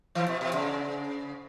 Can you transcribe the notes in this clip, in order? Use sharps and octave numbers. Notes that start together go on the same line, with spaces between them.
E3
B2
B2
C#3